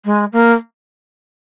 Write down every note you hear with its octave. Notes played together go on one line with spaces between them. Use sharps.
G#3
A#3